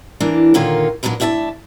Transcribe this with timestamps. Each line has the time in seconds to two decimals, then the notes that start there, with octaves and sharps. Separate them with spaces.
0.20 E3 A#3 D4
0.54 A#2 D3 D#3 A#3 F4 C#5
1.03 A#2 F#3 D4 D#4 B4
1.20 A2 D4 E5 G#5 A5